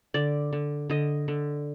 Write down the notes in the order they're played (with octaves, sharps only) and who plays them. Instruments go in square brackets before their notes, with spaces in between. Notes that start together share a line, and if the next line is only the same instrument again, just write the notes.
[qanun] D3 D5
D3
D3 D#5
D3